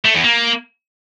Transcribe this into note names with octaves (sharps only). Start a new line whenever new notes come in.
A3
E2
A#3